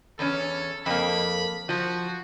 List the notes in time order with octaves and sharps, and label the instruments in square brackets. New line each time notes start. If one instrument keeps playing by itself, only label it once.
[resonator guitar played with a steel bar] E2 C#4 [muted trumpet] A4
[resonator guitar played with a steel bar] F2 A#3 [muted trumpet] B5
[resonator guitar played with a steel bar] F3 [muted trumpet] F#4